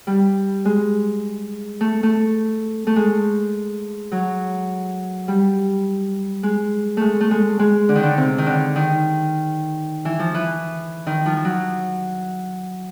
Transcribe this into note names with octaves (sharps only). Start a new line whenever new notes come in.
G3
G#3
A3
A3
A3
G#3
F#3
G3
G#3
G#3 A3
A3
G#3
G#3
D3
D#3
D3
C3
D#3
D3
D#3
E3
F3
E3
D#3
F3
F3
F#3